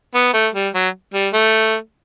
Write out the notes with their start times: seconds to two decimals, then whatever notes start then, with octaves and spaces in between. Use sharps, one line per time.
0.15 B3
0.34 A3
0.54 G3
0.74 F#3
1.14 G3
1.33 A3